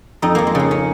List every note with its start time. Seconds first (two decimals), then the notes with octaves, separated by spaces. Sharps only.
0.22 F2 D#4
0.35 F2 A#3
0.47 G#3
0.55 C#3 A#3
0.71 C#4